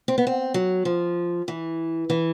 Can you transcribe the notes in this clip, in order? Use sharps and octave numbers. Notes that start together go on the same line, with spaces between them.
C4
B3
C4
F#3
F3
E3
E3